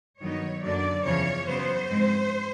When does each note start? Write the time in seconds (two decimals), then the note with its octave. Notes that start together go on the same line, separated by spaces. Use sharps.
0.20 G2 D#3 F#3 B3 D#4 C#5
0.63 F#2 D3 F#3 A#3 D4 D5
1.05 E2 C#3 F3 C#5
1.47 C#3 F#3 B3 C5
1.89 G#2 F3 G#3 C4